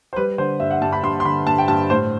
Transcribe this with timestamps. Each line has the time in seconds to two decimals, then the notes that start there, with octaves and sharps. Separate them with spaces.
0.13 C5
0.16 G3 B4
0.38 D3 C5
0.60 G2 E5
0.71 F#5
0.81 G2 A5
0.93 B5
1.03 G2 C6
1.20 C6
1.25 D3 B5
1.46 G2 A5
1.58 G5
1.68 G2 A5
1.90 A2 C5